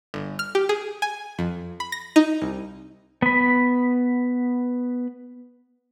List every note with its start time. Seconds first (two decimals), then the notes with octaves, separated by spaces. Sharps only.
0.14 G1
0.39 F6
0.55 G4
0.69 G#4
1.02 G#5
1.39 F2
1.80 B5
1.92 A#6
2.16 D#4
2.42 C2
3.22 B3 B5